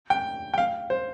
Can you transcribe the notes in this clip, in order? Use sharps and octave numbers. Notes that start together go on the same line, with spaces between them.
G5
G5
F5
C5